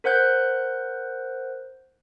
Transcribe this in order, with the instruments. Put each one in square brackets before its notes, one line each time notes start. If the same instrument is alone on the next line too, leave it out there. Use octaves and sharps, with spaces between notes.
[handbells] A#4 C5 F#5 F#6 G6